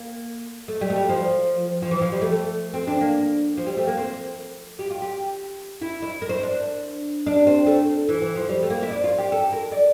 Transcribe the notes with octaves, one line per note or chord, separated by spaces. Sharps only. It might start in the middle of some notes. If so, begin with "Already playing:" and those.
Already playing: A#3
A3
G3
A3
G3
F3
F3
E3
F3
G3
A3
A3
C4
D4
A#3
F3
G3
A3
A#3
C4
G4
F4
G4
E4
E4
A#4
C5
D4
D4
C4
A3
E3
E3
F3
G3
A3
A#3
E4
D4
F4
G4
A4
A#4
D5